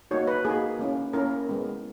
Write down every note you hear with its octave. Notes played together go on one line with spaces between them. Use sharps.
A#3 D#4 F#4 C#5
B4
A#3 D#4 F#4 G#4
A#3 C#4 E4
A#3 C#4 E4 A#4
G#3 B3 E4